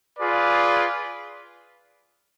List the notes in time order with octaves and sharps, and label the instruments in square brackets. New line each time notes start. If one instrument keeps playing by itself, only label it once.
[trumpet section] F4 G#4 B4 D5